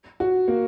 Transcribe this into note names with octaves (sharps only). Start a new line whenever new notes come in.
F#4
A#3